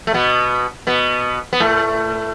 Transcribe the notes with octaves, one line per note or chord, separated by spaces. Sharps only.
A3
B2 B3
B2 B3
B3
A2 A3